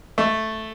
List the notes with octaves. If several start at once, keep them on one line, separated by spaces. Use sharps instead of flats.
A3